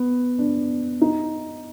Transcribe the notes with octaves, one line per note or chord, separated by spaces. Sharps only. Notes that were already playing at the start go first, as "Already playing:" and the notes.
Already playing: B3
D4
D#4